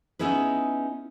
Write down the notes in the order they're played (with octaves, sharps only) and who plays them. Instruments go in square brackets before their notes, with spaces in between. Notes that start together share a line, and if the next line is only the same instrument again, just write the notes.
[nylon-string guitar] B3 C#4 D#4 E4 G#4 B4